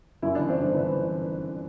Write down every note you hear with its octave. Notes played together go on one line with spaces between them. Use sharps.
F#2 E4
D4
E3
C4
G1 D4
E3 B4